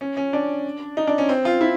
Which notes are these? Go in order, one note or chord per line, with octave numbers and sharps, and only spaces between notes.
C#4
C#4
D4
D#4
D4
C#4
C4
F4
E4